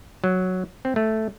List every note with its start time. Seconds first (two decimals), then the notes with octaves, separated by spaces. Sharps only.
0.24 F#3
0.85 C4
0.96 A3